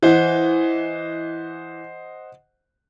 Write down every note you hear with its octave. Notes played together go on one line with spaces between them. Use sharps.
E3 C5 D#5 F#5